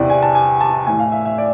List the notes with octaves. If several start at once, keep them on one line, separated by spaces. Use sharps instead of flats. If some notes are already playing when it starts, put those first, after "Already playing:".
Already playing: E2 C3 E3 D5
G#5
A5
G#5
A5
A2 E3 G#5
F5
E5
E5
D5